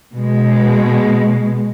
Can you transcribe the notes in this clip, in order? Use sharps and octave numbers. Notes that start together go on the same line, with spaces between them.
B2 G#3